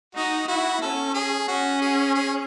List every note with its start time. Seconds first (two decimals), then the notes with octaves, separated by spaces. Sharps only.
0.15 D#4 F#4
0.48 E4 F#4
0.82 C#4 A4
1.15 G#4
1.48 C#4 F#4
1.81 G#4
2.15 G#4